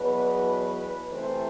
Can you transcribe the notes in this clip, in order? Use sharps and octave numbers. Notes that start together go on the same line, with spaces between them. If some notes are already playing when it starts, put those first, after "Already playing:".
Already playing: E2 B2 F#3 B4
C3 E3 A3 C4 C5